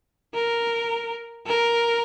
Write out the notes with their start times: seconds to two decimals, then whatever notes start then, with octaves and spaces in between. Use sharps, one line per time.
0.34 A#4
1.47 A#4